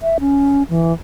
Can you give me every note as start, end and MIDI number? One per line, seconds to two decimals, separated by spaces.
0.01 0.18 76
0.20 0.63 61
0.70 0.93 52